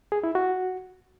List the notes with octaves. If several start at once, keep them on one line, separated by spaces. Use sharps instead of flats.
G#4
E4
F#4